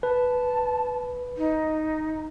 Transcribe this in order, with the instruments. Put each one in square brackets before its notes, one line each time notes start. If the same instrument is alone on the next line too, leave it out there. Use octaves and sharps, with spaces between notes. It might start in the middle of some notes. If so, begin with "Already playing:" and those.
[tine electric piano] B4 [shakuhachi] A5
[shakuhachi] D#4